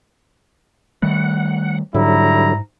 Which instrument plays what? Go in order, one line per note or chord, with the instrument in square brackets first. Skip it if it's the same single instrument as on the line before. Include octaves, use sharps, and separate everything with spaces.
[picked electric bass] D#3 G3 A3 [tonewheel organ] F#5
[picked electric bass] G#2 [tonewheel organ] D3 F#3 [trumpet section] G3 E4 A#5